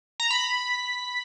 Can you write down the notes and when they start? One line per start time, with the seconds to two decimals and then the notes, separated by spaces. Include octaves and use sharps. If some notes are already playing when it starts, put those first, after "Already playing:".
0.20 A#5
0.31 B5